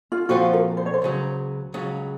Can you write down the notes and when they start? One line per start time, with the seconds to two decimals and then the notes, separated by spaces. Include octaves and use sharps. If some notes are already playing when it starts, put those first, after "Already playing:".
0.12 F4
0.29 A#2 F3 C4 F4 F#4 A4
0.53 A#4
0.77 C5
0.86 C#5
0.94 C5
1.02 C#2 C#3 F#3
1.74 C#2 C#3 F#3